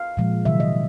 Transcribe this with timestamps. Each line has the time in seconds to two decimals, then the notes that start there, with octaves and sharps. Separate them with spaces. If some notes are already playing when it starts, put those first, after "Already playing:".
Already playing: F5
0.17 A#2 F3 G#3
0.45 C3 D#3 F#3 E5
0.60 D#5